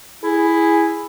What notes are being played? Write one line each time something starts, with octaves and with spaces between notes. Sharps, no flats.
E4 G#4